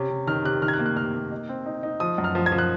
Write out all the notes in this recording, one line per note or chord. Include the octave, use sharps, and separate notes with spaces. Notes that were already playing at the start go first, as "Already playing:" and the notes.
Already playing: C3 C#4
C3
D#3 F6
C3 F#6
D#3 F6
G#6
F#6
A#3
F#6
C3 F6
A#3
D#4
C4
D#4
D#4
F3 D#6
F#2
F6
F3
G#6
F3
F#6